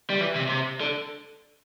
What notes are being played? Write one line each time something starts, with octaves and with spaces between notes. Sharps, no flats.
G3
E3
C3
C3
D3